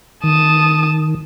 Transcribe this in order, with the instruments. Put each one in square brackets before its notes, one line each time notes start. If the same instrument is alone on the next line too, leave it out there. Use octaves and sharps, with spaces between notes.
[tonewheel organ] D#3 [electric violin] A5 D#6